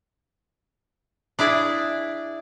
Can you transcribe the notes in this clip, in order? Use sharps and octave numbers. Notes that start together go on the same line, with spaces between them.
D4 E4 G#4 D5